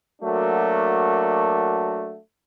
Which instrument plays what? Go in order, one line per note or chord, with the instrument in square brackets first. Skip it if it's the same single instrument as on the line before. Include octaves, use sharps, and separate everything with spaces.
[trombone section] F#3 A3 A#3 D4 F#4